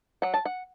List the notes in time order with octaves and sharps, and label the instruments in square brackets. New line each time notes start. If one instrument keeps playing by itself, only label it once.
[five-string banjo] F#3 F#5
A5
F#5